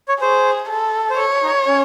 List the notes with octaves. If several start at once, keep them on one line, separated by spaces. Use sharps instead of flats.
C#5
G#4 C5
A4
C5
A4 C#5
D#4
C#4